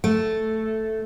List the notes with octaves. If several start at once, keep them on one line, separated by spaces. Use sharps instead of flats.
A3